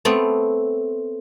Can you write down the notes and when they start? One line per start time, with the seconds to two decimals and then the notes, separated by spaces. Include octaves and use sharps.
0.05 A3 B3 C4